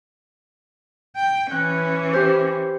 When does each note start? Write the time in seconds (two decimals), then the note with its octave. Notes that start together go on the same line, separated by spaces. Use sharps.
1.17 G5
1.51 E3 C#4 F#6
2.13 G4 C5